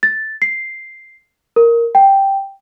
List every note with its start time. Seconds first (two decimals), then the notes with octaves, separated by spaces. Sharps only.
0.03 A6
0.42 C7
1.56 A#4
1.95 G5